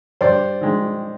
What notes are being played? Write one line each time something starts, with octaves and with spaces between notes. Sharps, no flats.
G2 C5 D5
D#3 G#3